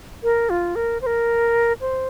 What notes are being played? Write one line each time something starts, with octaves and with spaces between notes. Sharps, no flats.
A#4
F4
A#4
C5
A#4
C5